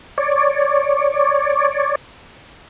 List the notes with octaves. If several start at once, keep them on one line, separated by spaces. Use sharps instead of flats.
C#5 D5